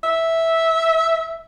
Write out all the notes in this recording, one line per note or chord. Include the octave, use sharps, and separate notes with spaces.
E5